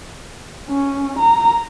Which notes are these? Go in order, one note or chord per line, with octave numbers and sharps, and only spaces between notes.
C#4
A#5